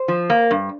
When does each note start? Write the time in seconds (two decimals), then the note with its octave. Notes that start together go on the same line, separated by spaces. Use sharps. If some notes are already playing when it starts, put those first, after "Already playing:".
Already playing: C5
0.08 F3
0.30 A#3
0.51 G2